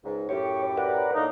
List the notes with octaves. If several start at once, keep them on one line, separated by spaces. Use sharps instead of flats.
C#2 G#2
F#2 A2 G4 C#5
A#4 B4 D5 F#5
A2 A#3 D4 D#4